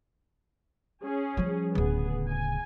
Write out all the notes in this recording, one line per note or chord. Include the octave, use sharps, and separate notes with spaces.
C#4 G#4
F3 G3
D1 C#3 B3 G#4
G#5